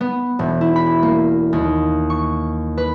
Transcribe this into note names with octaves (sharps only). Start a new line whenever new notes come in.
B3
E1
E4
B5
A#3
D#2
C#6
B4